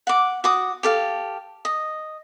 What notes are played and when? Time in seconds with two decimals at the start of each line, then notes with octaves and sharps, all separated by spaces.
0.07 F#5 D6
0.44 F#4 D6 D#6
0.83 G4 A4 F5
1.65 D#5